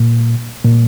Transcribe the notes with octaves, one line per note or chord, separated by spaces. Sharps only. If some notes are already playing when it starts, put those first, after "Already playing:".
Already playing: A#2
A#2